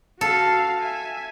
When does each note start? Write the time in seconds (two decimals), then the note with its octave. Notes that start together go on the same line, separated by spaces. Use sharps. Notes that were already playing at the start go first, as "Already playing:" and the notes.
0.21 F#4 A4 F5
0.82 E5 G#5